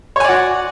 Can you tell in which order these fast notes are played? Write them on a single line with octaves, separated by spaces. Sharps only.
C#5 G#5 D5 F#4